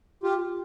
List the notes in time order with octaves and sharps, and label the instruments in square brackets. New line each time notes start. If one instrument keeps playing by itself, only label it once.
[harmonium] F4 G4